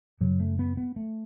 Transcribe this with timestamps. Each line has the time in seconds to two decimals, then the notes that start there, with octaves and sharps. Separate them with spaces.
0.21 F#2 C#3 F#3
0.40 A3
0.59 B3
0.77 B3
0.96 A3